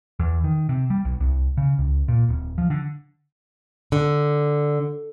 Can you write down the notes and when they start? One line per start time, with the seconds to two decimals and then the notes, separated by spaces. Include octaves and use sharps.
0.19 E2
0.44 D#3
0.69 C3
0.90 G3
1.05 B1
1.20 C2
1.57 C#3
1.78 C#2
2.08 A#2
2.29 D1
2.58 F3
2.70 D3
3.92 D3